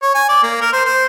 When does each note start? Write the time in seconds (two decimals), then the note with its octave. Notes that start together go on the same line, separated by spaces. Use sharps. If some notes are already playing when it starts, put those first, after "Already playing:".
0.03 C#5
0.15 G#5
0.29 D5
0.43 A#3
0.61 A#4
0.73 C5
0.86 C5